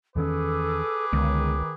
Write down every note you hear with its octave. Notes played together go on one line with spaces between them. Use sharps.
E2 D#3 C#4 G#4 A4 B4 D6
C#2 D3 D#3 G#3 B3